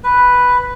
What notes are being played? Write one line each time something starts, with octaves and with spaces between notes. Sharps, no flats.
B4